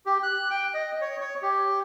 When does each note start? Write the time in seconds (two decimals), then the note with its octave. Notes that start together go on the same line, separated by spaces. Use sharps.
0.06 G4
0.23 F#6
0.51 G5
0.74 D#5
1.01 C#5
1.21 C#5
1.42 G4